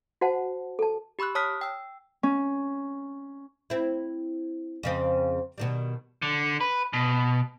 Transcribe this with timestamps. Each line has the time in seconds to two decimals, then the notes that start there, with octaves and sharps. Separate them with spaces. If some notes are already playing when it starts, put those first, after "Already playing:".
0.21 F#4 C5 F#5 A5
0.79 A4 A5
1.19 G4 B5 C#6 E6 F#6
1.35 C#5 A5 D#6 F6 F#6 B6
1.61 G5 E6
2.23 C#4
3.70 C4 E4
4.83 F2 C#3 C4
5.58 B2 D#3 G3
6.22 D3
6.61 B4
6.93 B2